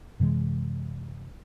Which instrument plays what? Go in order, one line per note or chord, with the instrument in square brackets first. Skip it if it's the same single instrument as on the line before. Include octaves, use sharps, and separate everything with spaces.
[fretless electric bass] F#2 C3 E3 G#3